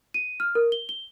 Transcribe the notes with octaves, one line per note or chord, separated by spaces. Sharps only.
D#7
F6
A#4
G7
G7